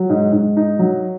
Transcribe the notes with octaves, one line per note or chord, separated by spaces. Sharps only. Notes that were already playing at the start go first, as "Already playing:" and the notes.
Already playing: F#3
G#2
G#2
D#4
F#3